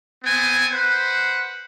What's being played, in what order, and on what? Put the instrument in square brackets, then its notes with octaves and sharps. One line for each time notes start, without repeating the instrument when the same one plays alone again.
[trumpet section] B3 C4 G#5
B4 C5 F#5